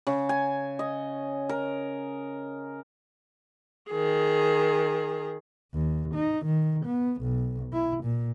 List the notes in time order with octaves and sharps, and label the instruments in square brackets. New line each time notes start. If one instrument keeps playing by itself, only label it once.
[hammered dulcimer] C#3
G#5
D#5
A#4
[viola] D#3 G#4
[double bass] D#2
D#4
D#3
B3
B1
E4
A#2